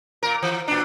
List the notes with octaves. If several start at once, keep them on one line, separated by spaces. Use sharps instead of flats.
A#2 A#4
E3
A#2 D4